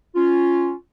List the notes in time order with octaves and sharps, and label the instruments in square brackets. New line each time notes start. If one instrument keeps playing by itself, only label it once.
[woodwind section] C#4 F4